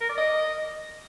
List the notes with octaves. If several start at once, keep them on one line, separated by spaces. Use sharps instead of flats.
A#4
D5
D#5